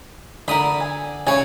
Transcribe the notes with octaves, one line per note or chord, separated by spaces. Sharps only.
D3 A#4 B5 D#6
G#5
C#3 C#5 G#5